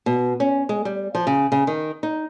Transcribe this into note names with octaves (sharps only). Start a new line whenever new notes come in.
B2
C#4
G#3
G3
F3
C#3
C#3
D#3
D#4